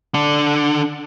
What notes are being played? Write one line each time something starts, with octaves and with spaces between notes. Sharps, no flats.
D3 D4